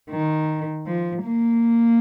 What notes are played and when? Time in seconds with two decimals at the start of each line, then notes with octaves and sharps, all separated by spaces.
0.10 D#3
0.87 F3
1.24 A#3